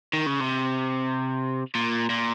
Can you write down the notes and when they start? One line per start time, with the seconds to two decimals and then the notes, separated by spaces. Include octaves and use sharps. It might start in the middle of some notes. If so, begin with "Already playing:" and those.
0.13 D#3
0.26 C#3
0.40 C3
1.75 A#2
2.10 A#2